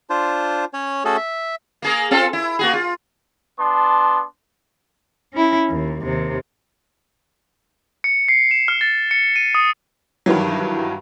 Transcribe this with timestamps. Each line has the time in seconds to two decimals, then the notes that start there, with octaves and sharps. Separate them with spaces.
0.10 D4 F4 C5
0.73 C#4 C#5
1.05 A3 C#4 F#4 G#4 A4
1.17 E5
1.82 A#3 G#4 A#4
2.11 C4 F4 A4
2.33 E4
2.59 A#3 F#4 G#4
2.73 F4
3.59 B3 D4 A5 C6
5.33 C#4 E4
5.69 D#2
6.02 D#2 C3
8.04 C#7
8.28 C7
8.51 E7
8.68 F6
8.81 A6
9.11 C#7
9.36 D#7
9.55 D#6
10.26 G2 D#3 E3 F#3